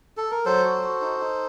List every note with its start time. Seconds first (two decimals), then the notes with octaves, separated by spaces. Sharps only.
0.17 A4
0.31 A#4
0.45 F#3 A4 C5
0.64 F#4
0.82 F#4
1.01 D#4
1.20 D#4